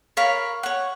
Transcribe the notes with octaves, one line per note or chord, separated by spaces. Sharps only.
A#4 C#5 F5 B5
C#5 F#5